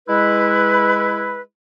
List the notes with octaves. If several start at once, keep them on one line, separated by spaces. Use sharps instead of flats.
G#3 E4 B4